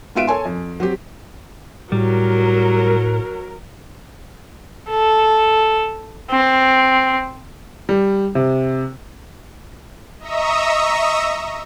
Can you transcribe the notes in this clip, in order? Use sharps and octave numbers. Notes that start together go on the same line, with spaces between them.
G#2 B3 F4 E5 D7 D#7
A4 C#5 G#5 C6
F2
F#3 C4 G4
A2 F#3 G3 A#4
A4
C4
G3
C3
D#5 E5 A#5 C#6 D#6 E6